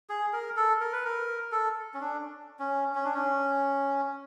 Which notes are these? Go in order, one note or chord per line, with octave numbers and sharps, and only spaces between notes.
G#4
A#4
A4
A#4
B4
A#4
A4
C#4
D4
C#4
C#4
D4
C#4